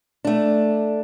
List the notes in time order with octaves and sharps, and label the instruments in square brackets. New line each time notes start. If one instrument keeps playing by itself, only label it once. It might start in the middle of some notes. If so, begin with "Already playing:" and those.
[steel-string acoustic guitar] A3 D4